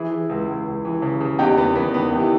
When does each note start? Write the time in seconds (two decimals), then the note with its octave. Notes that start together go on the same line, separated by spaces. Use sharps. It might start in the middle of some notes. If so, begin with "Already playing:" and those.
Already playing: E3 E4 G#4
0.11 E3
0.30 C#2
0.48 C#2
0.66 C#2
0.85 E3
1.02 C#3
1.21 C#3
1.39 E2 D#4 G4
1.57 D#3 B3
1.75 E2 B3
1.93 D#3 B3
2.11 E2 G4
2.20 E4